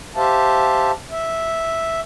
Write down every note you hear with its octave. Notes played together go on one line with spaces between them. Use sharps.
G4 C5 E5 F5 A5
E5